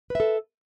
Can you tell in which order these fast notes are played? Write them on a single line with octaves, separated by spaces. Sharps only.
B4 E5 A4